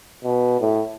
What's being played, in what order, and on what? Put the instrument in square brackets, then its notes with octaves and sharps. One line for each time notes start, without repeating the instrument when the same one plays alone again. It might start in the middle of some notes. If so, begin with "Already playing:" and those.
[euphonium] B2
A2